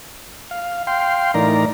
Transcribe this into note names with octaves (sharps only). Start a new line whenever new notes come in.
F5
F5 G5 C6
A2 E3 D#4 A#4 D5 A#5